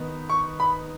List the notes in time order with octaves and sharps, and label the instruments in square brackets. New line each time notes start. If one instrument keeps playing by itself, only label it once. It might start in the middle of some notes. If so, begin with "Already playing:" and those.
Already playing: [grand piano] D#3 B3 D#4
[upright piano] C#6
B5